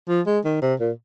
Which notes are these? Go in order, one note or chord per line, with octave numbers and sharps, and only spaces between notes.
F3
G#3
D#3
C3
A#2